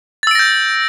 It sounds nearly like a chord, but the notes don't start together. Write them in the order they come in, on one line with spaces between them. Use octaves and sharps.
A6 E6 D7 A#6 G6